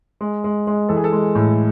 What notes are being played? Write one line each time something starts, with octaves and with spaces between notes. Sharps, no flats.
G#3
G#3
G#3
E3 A4
G#4
A4
G#3
A2